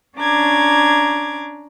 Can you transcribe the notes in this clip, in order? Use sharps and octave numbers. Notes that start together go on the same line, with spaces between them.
C#4 D4 A#5 D6 G#6